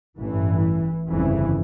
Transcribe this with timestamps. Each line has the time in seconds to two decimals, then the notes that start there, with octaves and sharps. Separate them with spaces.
0.20 A1 G2 E3
1.11 G1 F2 C#3 E3